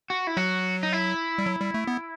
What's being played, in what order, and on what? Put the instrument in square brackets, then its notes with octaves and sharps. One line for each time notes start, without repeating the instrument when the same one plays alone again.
[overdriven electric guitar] F#4
E4
[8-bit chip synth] F#3 [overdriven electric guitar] F#4
[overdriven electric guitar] D#4
E4
[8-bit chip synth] G3
F#3
G3
A3
B3